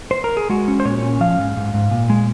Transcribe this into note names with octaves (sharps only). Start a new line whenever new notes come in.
C5
A#4
G#4
G#3 F#4
C#4
C5
A#2 C#5
C#4
F3 F5
G#2
G#2
G#2
A#2
G#3